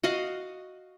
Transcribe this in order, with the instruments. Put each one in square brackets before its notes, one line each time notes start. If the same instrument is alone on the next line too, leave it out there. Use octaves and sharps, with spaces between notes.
[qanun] F#4 D#5 F5 F#5